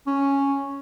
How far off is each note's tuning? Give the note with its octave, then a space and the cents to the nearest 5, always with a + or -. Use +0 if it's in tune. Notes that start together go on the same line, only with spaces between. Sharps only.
C#4 +0